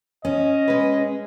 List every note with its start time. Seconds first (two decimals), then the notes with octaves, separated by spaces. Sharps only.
0.25 C#4 D#5
0.68 G#3 B4